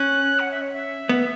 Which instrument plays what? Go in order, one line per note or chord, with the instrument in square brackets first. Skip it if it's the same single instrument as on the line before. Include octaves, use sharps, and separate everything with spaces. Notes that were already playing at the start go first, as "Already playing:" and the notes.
Already playing: [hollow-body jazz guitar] C#4 [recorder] F#6
[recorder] F#5
E5
C#5
E5
[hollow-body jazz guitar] B3